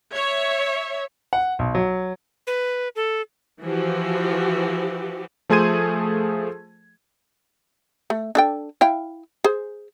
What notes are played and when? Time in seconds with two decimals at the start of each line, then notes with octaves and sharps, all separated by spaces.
0.12 C#5 E5
1.33 F#5
1.59 B1
1.75 F#3
2.47 B4
2.96 A4
3.62 E3 F3 F#4 G4
5.49 F3 A3 G#4 C5 G#6 D#7
8.10 A3
8.35 D4 A4 G5
8.81 E4 F5 G5
9.44 G#4 C5